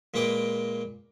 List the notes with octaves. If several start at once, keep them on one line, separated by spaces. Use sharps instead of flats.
A#2 G#3 A#3 B4 G5 D6